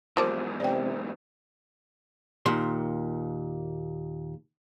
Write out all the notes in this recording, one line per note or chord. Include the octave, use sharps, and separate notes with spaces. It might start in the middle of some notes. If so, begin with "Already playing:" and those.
E2 G#2 F3 G3 A#3 C5 D6
C3 D5 G5
D#2 A#2 C6